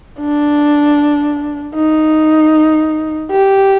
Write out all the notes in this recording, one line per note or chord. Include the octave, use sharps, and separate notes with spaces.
D4
D#4
G4